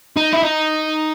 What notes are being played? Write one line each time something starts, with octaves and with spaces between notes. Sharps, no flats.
D#4
E4
D#4